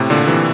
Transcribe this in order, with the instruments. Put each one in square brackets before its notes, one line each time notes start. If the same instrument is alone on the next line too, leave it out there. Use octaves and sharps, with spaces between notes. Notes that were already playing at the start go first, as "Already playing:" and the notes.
Already playing: [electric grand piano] A2 C3
A#2 D3
C3 E3